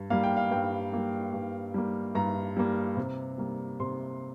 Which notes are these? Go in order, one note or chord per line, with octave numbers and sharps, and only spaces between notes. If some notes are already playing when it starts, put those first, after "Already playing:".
Already playing: G2
G3 A#3 F5
G5
F5
G2 G5
G3 A#3
G2
G3 A#3
G2 A#5
G3 A#3
C3
G3 A#3
C3 C6